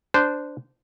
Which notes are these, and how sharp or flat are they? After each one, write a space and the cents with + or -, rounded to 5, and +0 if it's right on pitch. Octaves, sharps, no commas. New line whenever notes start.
D4 +0 C5 -15